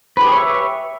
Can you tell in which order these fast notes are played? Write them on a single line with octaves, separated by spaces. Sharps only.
B4 G4 G#4 C#5 E5